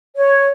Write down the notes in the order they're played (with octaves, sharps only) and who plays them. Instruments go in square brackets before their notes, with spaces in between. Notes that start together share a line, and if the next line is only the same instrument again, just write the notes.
[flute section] C#5